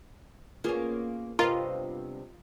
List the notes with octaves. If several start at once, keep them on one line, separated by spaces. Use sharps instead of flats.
A#3 B3 C#4 F4 G#4
G2 C3 B3 F4 A#4 D#5